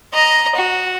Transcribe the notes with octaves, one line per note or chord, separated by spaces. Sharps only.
D#5 A#5
F#4